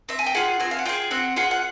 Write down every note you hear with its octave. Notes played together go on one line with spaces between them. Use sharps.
C4 E5
G#5
G5
F4 G#4 F#5
C4 G#5
F5
F#5
F4 G#4 G5
C4 F#5
F4 G#4 F#5
F#5